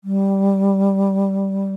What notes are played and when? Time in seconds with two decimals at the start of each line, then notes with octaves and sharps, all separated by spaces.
0.04 G3